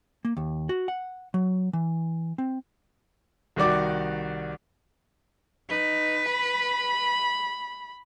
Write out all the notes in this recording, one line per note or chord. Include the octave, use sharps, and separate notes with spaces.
A#3
D#2
F#4
F#5
F#3
E3
C4
C2 D#3 F#4 D5 D6
D#4 B4
B5